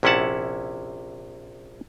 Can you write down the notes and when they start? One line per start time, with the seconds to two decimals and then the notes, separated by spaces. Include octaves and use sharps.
0.03 A#1 C3 C#4 E4 F#5 A5